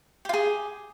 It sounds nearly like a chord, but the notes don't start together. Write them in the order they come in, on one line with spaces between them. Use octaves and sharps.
G4 F4 G#4